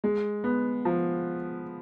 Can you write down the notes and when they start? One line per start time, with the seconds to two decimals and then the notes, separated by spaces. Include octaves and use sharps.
0.04 G#3
0.44 B3
0.85 F3